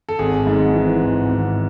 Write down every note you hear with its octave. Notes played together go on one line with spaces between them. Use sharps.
A4
G#1 G#4
G#2
E3
G#1
G#1